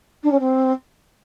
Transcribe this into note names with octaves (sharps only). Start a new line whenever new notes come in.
D4
C#4
C4